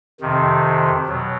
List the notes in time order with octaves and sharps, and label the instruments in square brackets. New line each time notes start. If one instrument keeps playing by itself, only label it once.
[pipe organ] F2 C3 D#3
B2 F#3